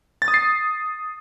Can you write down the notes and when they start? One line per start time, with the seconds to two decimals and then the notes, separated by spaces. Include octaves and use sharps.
0.22 A6
0.28 D#6
0.34 C7